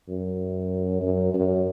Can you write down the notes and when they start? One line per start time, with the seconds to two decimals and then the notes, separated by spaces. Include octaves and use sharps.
0.09 F#2
1.02 F#2
1.34 F#2